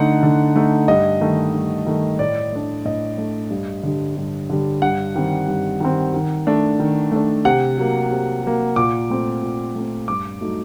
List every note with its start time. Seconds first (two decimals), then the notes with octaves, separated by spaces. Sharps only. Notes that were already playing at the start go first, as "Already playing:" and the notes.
Already playing: D3 A3 D#4 F#5
0.23 D3
0.56 A3 D#4
0.88 G2 D#5
1.21 D#3 A3
1.54 G2
1.86 D#3 A3
2.19 A2 D5
2.52 A3 D4
2.85 A2 D#5
3.18 A3 D4
3.50 G2
3.83 D3 G3
4.17 G2
4.50 D3 G3
4.82 G2 F#5
5.15 D#3 G3 C4
5.48 G2
5.80 D#3 G3 C4
6.14 D#3
6.47 A3 D4
6.79 D#3
7.12 A3 D4
7.45 C3 F#5
7.78 F#3 A#3
8.11 C3
8.43 F#3 A#3
8.76 A#2 D6
9.10 A3 C4
9.43 A#2
9.75 A3 C4
10.08 G2 D6
10.41 F#3 A3 D#4